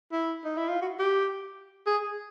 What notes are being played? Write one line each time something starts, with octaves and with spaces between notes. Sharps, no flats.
E4
D#4
E4
F4
F#4
G4
G#4